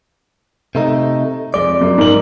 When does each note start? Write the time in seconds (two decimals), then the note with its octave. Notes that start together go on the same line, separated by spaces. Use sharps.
0.75 C3 A3 D#4
1.54 F2 G#3 D5
1.81 F#2
1.98 G#2 A#4 F#7